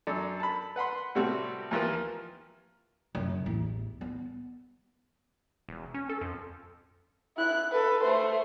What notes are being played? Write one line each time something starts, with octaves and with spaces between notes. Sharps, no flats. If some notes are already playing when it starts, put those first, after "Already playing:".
F#2 D4 A4 D5
A5 B5
B4 F#5 B5 C6
A2 C3 G3 C4 F#4 A4
D#2 E3 F3 F4 A#4 B4
F#2 C#3
A1 E2
B3
E1
C#4
A4
F2
E4 F#6
A4 B4
A3 C5